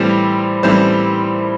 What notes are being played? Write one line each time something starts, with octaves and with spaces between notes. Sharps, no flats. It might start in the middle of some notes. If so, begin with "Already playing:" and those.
Already playing: A2 E3 G3 C4 C5
A2 E3 G3 C4 C5